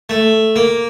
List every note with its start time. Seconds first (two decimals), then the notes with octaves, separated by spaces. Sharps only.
0.09 A3
0.56 A#3